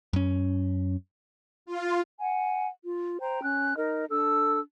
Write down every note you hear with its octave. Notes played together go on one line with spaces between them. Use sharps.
F#2 C#4
F4
F#5 G#5
F4
C5 G5 A#5
C#4 F#6
D#4 A#4 D#5
D4 A4 E6